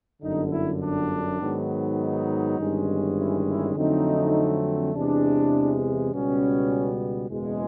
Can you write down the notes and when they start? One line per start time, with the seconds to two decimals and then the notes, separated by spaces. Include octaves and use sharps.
0.21 G1 F#2 D3 D#4
0.51 E4
0.81 D4
1.39 G#2 D#3 F#3 B3
1.99 D#4
2.58 G1 G2 D#3 G#3 C#4
3.17 E4
3.47 E4
3.75 F2 D3 F#3 A3 C4 D#4
4.93 E2 C3 E3 G#3 D4
6.11 C#2 B2 G3 B3 C#4
7.29 F#1 E2 B2 G#3